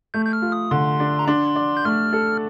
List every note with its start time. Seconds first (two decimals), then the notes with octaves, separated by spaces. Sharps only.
0.14 A3 G6
0.26 G6
0.33 F6
0.42 F4
0.52 D#6
0.71 D3 C6
1.00 D4
1.19 A#5
1.28 D4 C6
1.56 D5
1.77 G6
1.85 A3 F6
2.13 A4